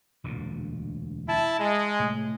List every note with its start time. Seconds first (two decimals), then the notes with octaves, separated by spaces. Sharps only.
0.24 E1 D2 A#2
1.27 E4 A5
1.59 G#3
1.99 A2 C3 A3